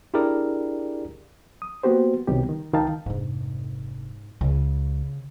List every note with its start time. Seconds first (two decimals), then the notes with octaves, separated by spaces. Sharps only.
0.14 D4 E4 G4 G#4 A#4 D5
1.62 D#6
1.83 A#3 B3 F#4 G4 C5
2.28 C2 B2 D#3 G4
2.49 D#3
2.73 C#2 D#3 D#4 F5 G5 A5
3.06 F1 G#2 D4
4.41 C#2 C#3